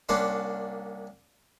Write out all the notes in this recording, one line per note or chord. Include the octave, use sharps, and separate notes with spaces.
C2 A#3 C#4 D4 F#5 C6